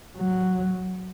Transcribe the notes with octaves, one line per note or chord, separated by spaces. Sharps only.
F#3